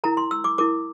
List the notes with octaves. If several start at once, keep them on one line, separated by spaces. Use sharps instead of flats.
E4 A#4 A#5
C6
E6
D6
E4 A#4 D6